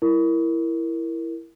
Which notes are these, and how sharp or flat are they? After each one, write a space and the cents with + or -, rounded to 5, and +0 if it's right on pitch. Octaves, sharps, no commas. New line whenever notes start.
E4 +10 A#4 +0